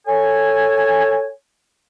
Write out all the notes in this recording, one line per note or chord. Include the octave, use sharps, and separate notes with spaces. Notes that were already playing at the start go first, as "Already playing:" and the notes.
A4 C#5 G#5